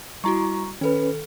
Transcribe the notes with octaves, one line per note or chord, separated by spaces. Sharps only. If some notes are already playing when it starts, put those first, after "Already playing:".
G3 E4 F#4 A#5 C#6
D#3 C#4 A4 B4